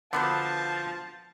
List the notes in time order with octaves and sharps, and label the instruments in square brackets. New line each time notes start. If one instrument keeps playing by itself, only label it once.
[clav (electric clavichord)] D3 B3 [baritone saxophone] F3 [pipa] F#4 B4 C5 [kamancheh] A5